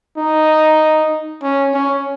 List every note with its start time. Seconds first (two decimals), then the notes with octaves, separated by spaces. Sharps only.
0.17 D#4
1.43 C#4
1.74 C#4